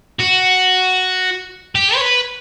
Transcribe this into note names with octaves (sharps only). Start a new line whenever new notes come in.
F#4
G4
C#5
B4